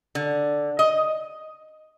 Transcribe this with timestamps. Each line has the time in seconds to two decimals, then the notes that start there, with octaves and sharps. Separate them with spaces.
0.15 D3
0.79 D#5